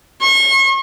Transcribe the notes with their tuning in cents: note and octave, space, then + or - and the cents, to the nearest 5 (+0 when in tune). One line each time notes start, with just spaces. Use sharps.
C#6 -40